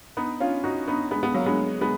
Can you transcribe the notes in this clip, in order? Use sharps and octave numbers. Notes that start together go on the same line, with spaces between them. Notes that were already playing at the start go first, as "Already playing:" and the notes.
B3 D#4
C#4 F4
D#4 F#4
B3 D#4
G#3 B3
G#3 B3
F#3 A#3
G#3 B3
G#3 B3